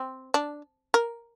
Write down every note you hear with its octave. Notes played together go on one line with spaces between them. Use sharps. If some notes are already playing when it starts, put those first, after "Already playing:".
Already playing: C4
D4
A#4